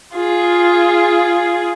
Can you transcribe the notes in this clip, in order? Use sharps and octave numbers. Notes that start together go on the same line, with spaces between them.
F4 G#4